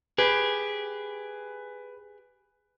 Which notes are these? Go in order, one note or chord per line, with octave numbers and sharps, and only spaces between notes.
G4 G#4 B4 B5